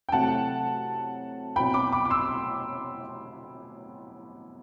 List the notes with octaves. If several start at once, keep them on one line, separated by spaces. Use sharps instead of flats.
G5
C3 F#3 A3 C4 E4 F#5 A5
B2 F#3 C4 E4 G5 B5
B5 D6
B5 D6
D6
C6 E6